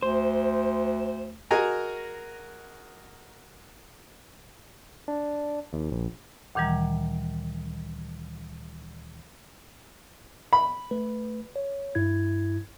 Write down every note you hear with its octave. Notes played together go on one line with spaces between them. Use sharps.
D2 C5
F#4 G#4 A#4 D#5 G#5 A#5
D4
D#2
A#1
D2 A#2 D#3 E3 G3 A#5
B5
A3 B4
C#5
G2 E4 G#6